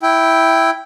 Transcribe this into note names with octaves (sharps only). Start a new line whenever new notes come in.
E4 G5